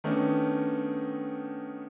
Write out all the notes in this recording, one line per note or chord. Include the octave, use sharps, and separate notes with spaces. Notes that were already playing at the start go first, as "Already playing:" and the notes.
D#3 A3 B3 C#4 D4